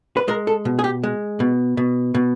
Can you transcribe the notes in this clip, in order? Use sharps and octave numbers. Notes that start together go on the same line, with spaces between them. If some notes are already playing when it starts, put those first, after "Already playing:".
B4
G#3 A#4
A4
B2
G#4
G4
G#3
B2
B2
B2